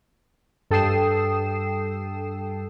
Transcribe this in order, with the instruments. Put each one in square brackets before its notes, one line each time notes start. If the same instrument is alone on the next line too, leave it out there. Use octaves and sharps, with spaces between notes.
[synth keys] G2 A4 G5 D#6 C7 E7